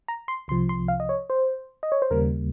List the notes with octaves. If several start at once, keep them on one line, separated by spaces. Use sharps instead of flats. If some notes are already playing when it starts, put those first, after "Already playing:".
A#5
C6
C2 C3 F3 C6
C6
F5
D#5
C#5
C5
D#5
C#5
C5
D#2 C#3 G3 A#3 A#4